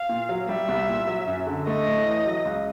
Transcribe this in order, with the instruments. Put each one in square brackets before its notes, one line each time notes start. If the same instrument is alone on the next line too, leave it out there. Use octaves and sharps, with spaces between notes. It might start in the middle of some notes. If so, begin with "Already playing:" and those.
Already playing: [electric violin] F5
[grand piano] A#2
F#3
[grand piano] G3 [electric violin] E5
[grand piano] C2
A#2
F#3
F#2
D3
[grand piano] A3 [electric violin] D#5
[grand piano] A2
E3
F#3
C#2